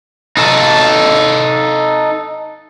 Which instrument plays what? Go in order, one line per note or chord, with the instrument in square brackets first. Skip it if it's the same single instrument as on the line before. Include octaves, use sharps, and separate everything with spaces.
[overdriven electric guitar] D#4 A4